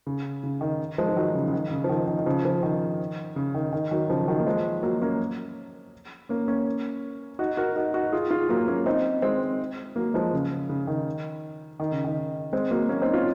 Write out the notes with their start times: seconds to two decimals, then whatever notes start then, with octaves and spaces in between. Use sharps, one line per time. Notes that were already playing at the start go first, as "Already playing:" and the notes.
0.07 C#3
0.44 C#3
0.61 D#3
0.98 F3 G#3
1.09 F3
1.16 D#3 F#3
1.35 C#3
1.48 C#3
1.53 D#3
1.71 C#3
1.84 F3
1.89 D#3
2.07 D#3
2.18 D#3
2.26 C#3 F3
2.44 C#3 F3
2.63 D#3
3.36 C#3
3.54 D#3
3.73 D#3
3.91 D#3 F#3
4.10 C#3 F3
4.28 D#3 F#3
4.40 A#3
4.46 F3 G#3
4.83 F#3 A#3
5.02 A#3 C#4
6.29 A#3 C#4
6.48 A#3 C#4
7.39 D#4 F#4
7.57 F#4 A#4
7.76 D#4 F#4
7.94 D#4 F#4
8.12 F4 G#4
8.31 F4 G#4
8.49 F#3 A#3
8.68 A#3 C#4
8.86 C4 D#4
9.22 G#3 C4
9.96 F#3 A#3
10.14 F3 G#3
10.34 C#3
10.69 C#3
10.87 D#3
11.80 D#3
11.92 C#3
12.04 D#3
12.53 G#3 C4
12.71 F#3 A#3
12.89 A#3 C#4
13.01 C4 D#4
13.13 C#4 F4